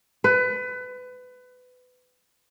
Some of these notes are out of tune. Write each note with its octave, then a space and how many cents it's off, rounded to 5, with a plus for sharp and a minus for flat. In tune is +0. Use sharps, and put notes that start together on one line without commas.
B4 +25